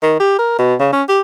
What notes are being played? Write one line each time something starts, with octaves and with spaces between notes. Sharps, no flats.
D#3
G4
A#4
B2
C#3
C#4
G4